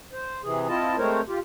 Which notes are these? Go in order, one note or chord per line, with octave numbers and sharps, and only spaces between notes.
C5
C3 E3 G#4
C4 E4 F4 D#5 A5
G#3 A3 C4 A#4 C5 C#5
F4 G4